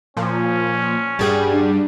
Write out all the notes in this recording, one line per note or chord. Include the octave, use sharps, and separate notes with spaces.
A#2 F3 C#4
G2 G3 G4 G#4 F#5
D4